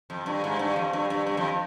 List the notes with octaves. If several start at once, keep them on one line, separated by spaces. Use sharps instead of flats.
F2
G2
G#2
G2
F2
G2
G2
G2
F2